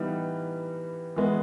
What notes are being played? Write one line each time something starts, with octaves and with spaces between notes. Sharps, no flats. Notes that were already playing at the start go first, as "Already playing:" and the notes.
Already playing: E3 G3 B3 D#4
E3 G#3 B3